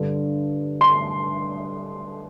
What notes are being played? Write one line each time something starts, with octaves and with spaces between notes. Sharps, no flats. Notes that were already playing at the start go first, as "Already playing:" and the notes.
Already playing: G2 D3
C6